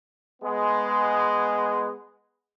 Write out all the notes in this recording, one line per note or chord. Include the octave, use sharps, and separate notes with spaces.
G#3 B3